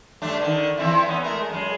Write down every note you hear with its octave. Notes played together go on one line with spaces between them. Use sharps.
G2 A3 D4
D3 D#3
E3 C4 E4
B3 C#4
G#3 A3 A#4
F#2 G#3